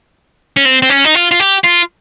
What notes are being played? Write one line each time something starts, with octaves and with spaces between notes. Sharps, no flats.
C#4
C4
C4
C#4
D#4
F4
F4
G4
F4